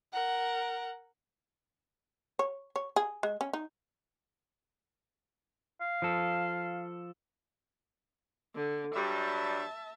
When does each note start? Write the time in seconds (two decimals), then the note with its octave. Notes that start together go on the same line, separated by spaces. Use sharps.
0.13 A#4 F#5
2.39 C#5
2.76 C#5
2.96 G#4
3.23 G#3
3.41 C#4
3.53 D#4
5.81 F5
6.02 F3 A4
8.54 D3
8.94 G2 F#3 G3 E5 A5